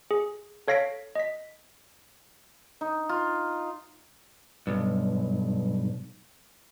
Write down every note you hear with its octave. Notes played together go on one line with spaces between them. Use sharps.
G#4
A4 C#5 F5 A#6 B6 D7
D#5 B6
D#4
F4
B1 G2